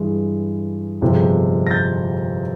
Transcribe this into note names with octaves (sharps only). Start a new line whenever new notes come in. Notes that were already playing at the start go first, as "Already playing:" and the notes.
Already playing: G2 E3 G#3
G1 F2 C3 F3 G#3
A#6
G6 A6